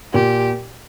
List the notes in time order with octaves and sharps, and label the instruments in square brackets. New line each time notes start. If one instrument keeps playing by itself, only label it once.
[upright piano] A#2 [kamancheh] G4